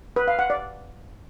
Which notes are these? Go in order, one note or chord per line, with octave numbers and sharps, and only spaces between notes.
B4
F5
F#5
D5